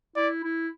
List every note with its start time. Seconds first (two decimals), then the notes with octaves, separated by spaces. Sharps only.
0.16 E4 D5
0.44 E4